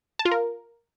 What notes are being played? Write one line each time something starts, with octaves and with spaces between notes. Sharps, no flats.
A5
F4
A#4